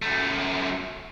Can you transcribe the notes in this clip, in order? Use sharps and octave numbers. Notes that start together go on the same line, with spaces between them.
F#2 A3